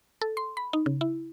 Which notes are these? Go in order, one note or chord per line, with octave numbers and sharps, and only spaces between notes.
A4
C6
B5
D#4
C#3
E4